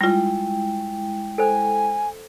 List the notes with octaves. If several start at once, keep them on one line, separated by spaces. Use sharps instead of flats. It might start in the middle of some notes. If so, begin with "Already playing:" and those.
G3 G#3 E4 F4 G5
A4 C5 G#5